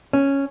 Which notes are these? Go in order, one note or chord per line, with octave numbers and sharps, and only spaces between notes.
C#4